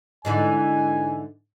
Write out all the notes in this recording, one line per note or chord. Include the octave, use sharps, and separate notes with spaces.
G#2 D3 E3 G#5